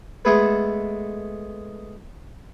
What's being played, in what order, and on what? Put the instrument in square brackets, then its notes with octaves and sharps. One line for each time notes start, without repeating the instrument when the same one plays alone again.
[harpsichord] G#3 A3 B3 G#4 A4 B4